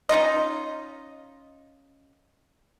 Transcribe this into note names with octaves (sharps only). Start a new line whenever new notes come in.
C#4 D#4 F4 D#5